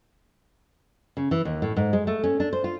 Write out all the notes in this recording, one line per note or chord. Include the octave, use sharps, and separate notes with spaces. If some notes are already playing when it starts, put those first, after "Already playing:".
C#3
E3
D#2
A2
G#2
G#3
A3
C#4
D4
C5
F4